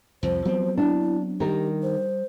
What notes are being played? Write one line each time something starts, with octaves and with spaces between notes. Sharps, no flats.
C2 F2 F3 C5
F#3 B3 C4
D4 E4
D#3 G3 G4 A#4
C5